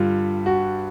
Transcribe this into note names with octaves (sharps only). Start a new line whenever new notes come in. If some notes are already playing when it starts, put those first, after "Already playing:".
Already playing: G2 D3 G3 F4
F#4